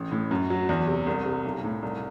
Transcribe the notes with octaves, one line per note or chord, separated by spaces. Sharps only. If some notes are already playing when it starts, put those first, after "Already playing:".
Already playing: A1
A2
F#2
F#3
E2
C3
C2
C3
B1
A2
C2